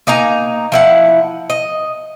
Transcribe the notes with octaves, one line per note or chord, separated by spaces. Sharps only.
A#3 D#4 G#5 A#5
F3 E4 F#5
D#5